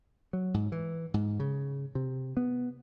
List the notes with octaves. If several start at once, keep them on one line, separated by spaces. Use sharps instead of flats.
F#3
G#2
E3
G#2
C#3
C3
B3